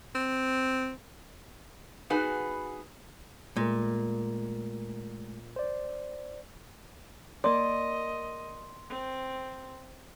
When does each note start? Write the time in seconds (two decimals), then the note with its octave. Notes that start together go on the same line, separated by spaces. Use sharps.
0.15 C4
2.10 B3 D#4 F#4 G#4 B4 G#5
3.56 A#2 G#3 A3 A#4
5.56 C5 D5
7.44 A#3 D5 D#5 C6
8.90 C4